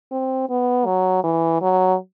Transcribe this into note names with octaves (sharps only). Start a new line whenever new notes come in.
C4
B3
F#3
E3
F#3